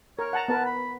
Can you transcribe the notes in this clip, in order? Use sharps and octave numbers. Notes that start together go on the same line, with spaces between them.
A#4 C#5
F#5 A5 A#5
B3 A#4 B4 A5
B5